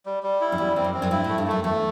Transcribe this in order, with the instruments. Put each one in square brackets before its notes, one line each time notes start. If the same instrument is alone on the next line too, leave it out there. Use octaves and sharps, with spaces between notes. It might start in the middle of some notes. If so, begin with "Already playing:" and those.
[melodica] G3
G3
E4
[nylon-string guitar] F#2
[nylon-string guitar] E2 [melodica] G3
[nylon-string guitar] E2 [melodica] C4
[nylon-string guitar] F#2
[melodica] C4
[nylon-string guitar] F#2
[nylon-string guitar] G2 [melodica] E4
[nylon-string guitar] A2
[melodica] A3
[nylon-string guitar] G2
[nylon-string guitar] F#2 [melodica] A3
[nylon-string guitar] E2 [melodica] A3